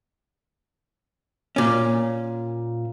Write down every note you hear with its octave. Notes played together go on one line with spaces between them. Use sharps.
A#2 C#4